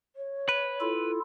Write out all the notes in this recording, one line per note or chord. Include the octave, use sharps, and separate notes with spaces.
C#5
B4
E4 F4 A4